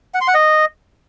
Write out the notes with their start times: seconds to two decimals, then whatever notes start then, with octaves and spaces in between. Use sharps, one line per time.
0.14 F#5
0.21 C6
0.28 F#5
0.34 D#5